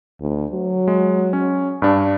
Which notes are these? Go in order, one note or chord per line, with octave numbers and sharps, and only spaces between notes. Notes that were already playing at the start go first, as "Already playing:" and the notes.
D2
F#3
G#3
C#4
G2 D4